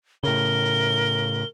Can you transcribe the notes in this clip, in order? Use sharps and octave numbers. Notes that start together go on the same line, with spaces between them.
A2 C#3 A#4 G7